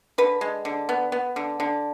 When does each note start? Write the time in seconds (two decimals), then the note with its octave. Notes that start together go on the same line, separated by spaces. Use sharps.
0.18 D3 B4
0.41 G#3
0.65 D3
0.89 B3
1.12 B3
1.36 D3
1.60 D3